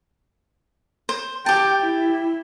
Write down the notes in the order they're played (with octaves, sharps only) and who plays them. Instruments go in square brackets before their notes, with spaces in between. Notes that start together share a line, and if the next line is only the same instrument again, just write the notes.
[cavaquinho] C5
[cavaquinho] G4 A5 [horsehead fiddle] G5
[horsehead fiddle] E4